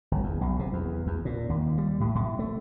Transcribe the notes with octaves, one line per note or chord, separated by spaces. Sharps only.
G1
E2
B1
C3
E2
E2
A#2
D#2
G3
A2
A2
A3